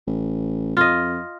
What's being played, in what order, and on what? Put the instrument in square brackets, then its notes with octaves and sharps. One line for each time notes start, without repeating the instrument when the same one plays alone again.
[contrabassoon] A1
[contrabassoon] F2 [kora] F4 D#5